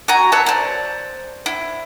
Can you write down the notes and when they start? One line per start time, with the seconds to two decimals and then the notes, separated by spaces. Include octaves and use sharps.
0.08 F#4 G#5 A#5
0.32 B4 C#5 E5 A5
0.46 C5 D5
1.46 E4